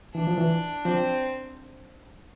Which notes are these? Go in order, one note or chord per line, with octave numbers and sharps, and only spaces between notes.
E3 D4
F3
E3
F3 C4